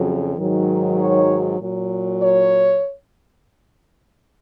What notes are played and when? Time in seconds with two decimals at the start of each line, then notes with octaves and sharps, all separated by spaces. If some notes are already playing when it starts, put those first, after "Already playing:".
Already playing: F2 C#3 F#3
0.38 G#2 D#3 F#3
0.99 C#5
1.59 A#2 F#3
2.20 C#5